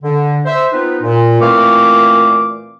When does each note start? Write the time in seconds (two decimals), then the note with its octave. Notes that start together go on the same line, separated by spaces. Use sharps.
0.03 D3
0.46 C5 E5
0.73 B3 C4 D#4 F4 B4
1.02 A#2
1.41 A#2 E3 A3 C4 F5 D6